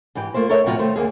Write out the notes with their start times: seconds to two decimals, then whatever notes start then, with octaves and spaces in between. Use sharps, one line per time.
0.15 G#2 E3 G4 G5
0.34 A3 A#3 F4 C5
0.49 A4 A#4 C#5 E5
0.66 A2 C3 F#3 C#4 F4 F#4
0.79 D#3 A3 C5
0.96 D2 A#3 G#4